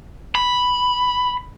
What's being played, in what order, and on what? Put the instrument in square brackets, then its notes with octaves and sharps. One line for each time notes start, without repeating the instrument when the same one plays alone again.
[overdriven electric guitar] B5